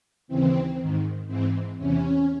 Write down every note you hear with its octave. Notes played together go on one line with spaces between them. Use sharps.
D#2 C#3 E3 C4
G#2 D#3
G#2 E3 C4
E2 C3 E3 C#4